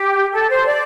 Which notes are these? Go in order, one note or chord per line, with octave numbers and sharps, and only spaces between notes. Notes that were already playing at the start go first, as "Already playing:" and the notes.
Already playing: G4
A4
C5
D5